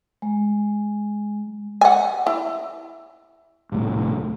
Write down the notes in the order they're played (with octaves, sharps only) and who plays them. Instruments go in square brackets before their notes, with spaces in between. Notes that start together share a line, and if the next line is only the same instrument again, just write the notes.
[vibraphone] G#3
[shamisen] F#5 G#5
E4
[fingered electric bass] D#1 C2 A2